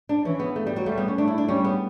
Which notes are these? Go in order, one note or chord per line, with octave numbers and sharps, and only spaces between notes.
D4
E3 C#4
B3
A3
G3
F#3
G3 A3
B3
C#4
A3 D4
E4
D4
G3 C#4
B3